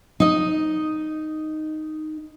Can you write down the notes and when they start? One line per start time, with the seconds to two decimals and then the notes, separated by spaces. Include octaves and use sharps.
0.20 D#4 D#5